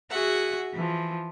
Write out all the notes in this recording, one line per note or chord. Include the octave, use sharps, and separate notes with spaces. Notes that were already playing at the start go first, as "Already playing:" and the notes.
F#4 G#4 E5 F#5
E3 F3